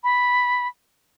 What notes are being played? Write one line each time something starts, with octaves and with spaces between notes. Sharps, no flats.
B5